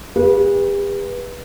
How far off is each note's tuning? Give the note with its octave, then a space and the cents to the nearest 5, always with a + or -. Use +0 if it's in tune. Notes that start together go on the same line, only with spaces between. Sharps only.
G4 +45 B4 -20